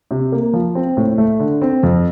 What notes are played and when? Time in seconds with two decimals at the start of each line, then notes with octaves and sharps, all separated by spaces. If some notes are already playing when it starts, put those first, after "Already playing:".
0.11 C3
0.32 A#3
0.53 F3
0.75 C4
0.97 A2
1.18 A3
1.40 D3
1.62 C4
1.83 F2